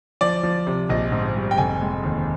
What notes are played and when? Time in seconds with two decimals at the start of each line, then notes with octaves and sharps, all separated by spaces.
0.21 F3 D5
0.43 F3
0.67 C3
0.89 A#1 D#5
1.12 G#2
1.36 G3
1.51 G5
1.58 F1 G#5
1.81 G#3
2.03 D#2